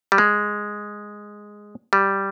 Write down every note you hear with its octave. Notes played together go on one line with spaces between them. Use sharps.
G3
G#3
G3